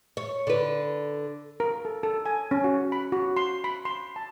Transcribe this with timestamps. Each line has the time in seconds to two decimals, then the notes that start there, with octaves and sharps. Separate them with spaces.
0.17 C#5
0.47 D3 B4
1.60 A#4
1.85 A4
2.03 A4
2.26 G#5
2.51 C#4
2.64 F#4
2.92 B5
3.12 F#4
3.37 C6
3.64 B5
3.85 C6
4.16 A5